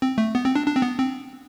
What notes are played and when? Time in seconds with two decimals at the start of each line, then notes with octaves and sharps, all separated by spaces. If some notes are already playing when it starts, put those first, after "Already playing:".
0.02 C4
0.18 A3
0.35 B3
0.45 C4
0.55 D4
0.67 D4
0.76 C4
0.82 B3
0.99 C4